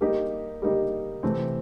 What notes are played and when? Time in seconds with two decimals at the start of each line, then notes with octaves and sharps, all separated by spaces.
0.01 G3 A#3 D#4 G4
0.62 G3 A#3 D#4 G4
1.23 C3 E3 A3 C4